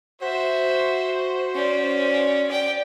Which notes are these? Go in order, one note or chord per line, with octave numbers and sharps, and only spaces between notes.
F#4 C5 E5
C#4 D5
D5 G5